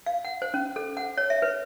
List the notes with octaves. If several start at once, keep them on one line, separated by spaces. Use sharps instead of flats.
F5
F#5
C5
C#4
A4
F#5
C#5
E5
B4